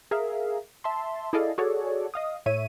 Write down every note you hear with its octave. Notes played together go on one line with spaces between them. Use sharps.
G#4 A#4 E5 F5
E5 A5 C6
E4 G#4 A4 D5 D#5 F5
F#4 G#4 A4 C#5 D5
D#5 F5 D#6
A2 C#5 E5 D#7